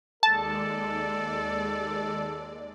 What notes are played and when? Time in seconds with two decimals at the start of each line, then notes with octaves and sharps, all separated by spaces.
0.23 D#2 G#3 A4 D5 A5